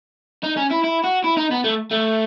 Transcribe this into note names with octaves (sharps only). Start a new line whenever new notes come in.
D#4
C#4
E4
E4
F#4
E4
D#4
B3
A3
A3